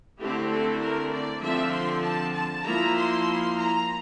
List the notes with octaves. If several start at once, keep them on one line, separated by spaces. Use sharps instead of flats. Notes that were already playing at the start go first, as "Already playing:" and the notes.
D3 A3 C4 E4 G4
A4
A#4
D5
D3 F3 C4 E5
C6
A5
A5
F3 A#3 E4 A#5
C6
A#5